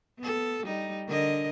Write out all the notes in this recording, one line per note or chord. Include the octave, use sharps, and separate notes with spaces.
B3 A4
G3 D#4
D3 A#4 D#5